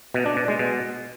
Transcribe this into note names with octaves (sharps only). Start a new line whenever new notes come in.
B2
D4
B2
G#3
B2